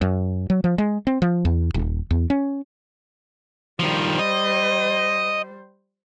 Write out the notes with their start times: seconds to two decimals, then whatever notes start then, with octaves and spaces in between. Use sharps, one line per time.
0.01 F#2
0.50 F#3
0.64 F3
0.78 G#3
1.07 C4
1.22 F3
1.45 E2
1.74 D#1
2.11 E2
2.30 C#4
3.80 D#3 F3 G3 C5
4.19 D#5